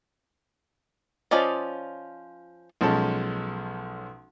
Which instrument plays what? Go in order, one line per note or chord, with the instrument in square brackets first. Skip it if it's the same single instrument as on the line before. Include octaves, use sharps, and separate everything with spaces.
[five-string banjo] F3 C#4 F4 D5 D#5
[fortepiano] B1 F3 G#3 C#4 A4 A5